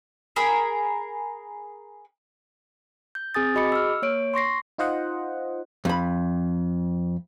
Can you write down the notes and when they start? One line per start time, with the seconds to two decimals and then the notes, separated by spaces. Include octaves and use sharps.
0.36 G#4 A#4 B5
3.15 G6
3.34 C4 G#4 G#5 D#6 A6
3.55 F#4 G#4 D#5 B5 D6 C#7
3.72 E6 F6
4.02 A#3 C#5 D7
4.34 C6 C#6 A#6 C7
4.78 D#4 F4 C5 D#5 F#5
5.85 F2 B5